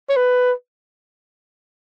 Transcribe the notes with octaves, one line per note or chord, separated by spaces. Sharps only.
C#5
B4